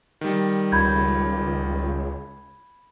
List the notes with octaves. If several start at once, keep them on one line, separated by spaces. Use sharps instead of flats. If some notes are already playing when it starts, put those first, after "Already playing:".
D#3 G3
C#2 B5 G6 G#6